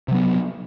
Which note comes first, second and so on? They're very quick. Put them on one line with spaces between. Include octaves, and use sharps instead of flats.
C3 F#3 B3